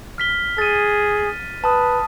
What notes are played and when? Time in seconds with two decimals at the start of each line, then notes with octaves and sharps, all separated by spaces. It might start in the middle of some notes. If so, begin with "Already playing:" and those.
0.18 F6 B6 G7
0.58 G#4 A6 D#7
1.64 B4 A5 D#6